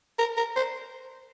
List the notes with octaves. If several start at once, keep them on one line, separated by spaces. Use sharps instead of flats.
A#4
A#4
C5